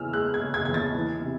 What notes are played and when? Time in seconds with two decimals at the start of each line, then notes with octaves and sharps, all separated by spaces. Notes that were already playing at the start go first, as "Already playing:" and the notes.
Already playing: E2 C#3 E3 G#5 E6 F6
0.13 G#3 F#6
0.34 G#6
0.40 C#3
0.54 G#6
0.65 E2 G#6
0.74 A6
0.95 E3
1.21 C3